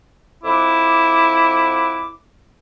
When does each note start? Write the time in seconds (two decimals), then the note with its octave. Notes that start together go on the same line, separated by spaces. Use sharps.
0.44 F2 E4 F#5 D6